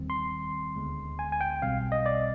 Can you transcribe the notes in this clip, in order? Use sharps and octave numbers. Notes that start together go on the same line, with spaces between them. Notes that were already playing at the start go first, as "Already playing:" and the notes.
Already playing: D#2 D#3 G3 C4
C6
D2 D3 G#3 B3
G#5
G#5
G5
B1 B2 G3 C4 F5
D#5
D5